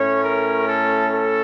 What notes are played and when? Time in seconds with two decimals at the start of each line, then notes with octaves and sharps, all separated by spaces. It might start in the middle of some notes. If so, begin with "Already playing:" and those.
Already playing: A2 A3 C#4 C#5
0.24 A#4
0.68 A4
1.10 A4